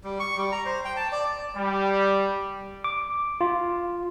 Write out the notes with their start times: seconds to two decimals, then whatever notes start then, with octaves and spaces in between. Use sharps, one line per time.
0.04 G3
0.20 C#6
0.38 G3
0.52 A#5
0.66 C5
0.85 G5
0.97 A5
1.12 D5
1.56 G3
2.84 D6
3.41 F4